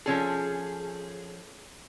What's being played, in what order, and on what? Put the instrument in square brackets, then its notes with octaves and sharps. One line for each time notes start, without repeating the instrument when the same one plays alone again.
[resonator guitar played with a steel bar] F3 C#4 A4 [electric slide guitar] G#4